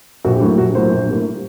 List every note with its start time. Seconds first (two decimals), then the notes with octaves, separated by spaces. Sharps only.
0.25 A#1 F#4
0.36 G4
0.41 A2 F#3 A#3
0.58 A#1 F#4
0.75 A2 F#3 A#3 C5
0.92 A#1
1.09 A2 G3 A#3